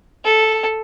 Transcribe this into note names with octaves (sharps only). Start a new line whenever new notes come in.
A4